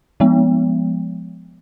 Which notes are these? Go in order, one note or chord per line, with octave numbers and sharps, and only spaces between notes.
F3 G#3 B3